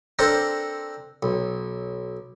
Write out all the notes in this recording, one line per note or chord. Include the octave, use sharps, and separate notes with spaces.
C4 D4 A4 A#4 C5 A#5
B1